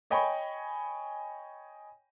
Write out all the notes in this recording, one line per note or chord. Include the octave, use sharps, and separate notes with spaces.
C#5 D#5 G5 G#5 B5 C#6